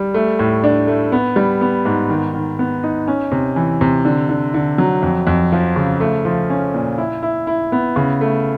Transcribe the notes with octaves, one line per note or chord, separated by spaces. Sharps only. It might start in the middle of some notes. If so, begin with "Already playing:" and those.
Already playing: G3
A3
A2
D4
A3
B3
G3
B3
G#2
D#3
D#3
B3
D#4
C#4
C3
E3
C3
D3
D3
D3
F#3
F2
F2
F3
C#3
A3
F3
C#4
A#2
E4
E4
E4
B3
C#3
A3